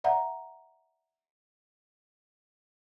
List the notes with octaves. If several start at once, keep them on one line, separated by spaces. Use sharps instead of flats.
D5 E5 F#5 A#5